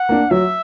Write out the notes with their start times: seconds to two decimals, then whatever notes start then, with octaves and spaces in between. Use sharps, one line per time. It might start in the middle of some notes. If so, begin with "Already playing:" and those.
Already playing: F#5
0.09 A#3 D4
0.31 F#3 E5